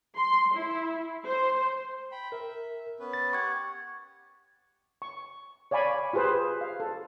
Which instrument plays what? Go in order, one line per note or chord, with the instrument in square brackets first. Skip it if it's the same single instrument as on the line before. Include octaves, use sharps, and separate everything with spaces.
[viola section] C6
E4
C5
[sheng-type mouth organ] G5 B5
[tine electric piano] A#4 [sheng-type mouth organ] E5
[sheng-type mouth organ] B3 C#4 B4
[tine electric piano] A6
[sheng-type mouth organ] G4 F#5 [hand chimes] C#6 G#6
[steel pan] C#6
C#5 D5 F5 G#5 B5
F4 G4 G#4 B4 C5
F5
A4